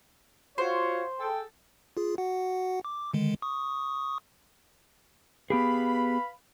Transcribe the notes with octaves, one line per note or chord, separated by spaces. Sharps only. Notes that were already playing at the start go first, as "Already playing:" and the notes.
F4 F#4 C5 C#5
G#4 A4 G5
F4 G#4
F#4 F#5
D6
D3 D#3 G#3
C#6 D#6
B3 G4 G#4 B4 F5 B5